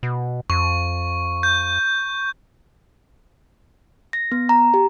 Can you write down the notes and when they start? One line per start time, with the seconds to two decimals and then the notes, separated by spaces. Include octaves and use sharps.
0.03 B2
0.50 F2 C#6
1.43 G6
4.13 A#6
4.32 B3
4.49 A#5
4.74 G4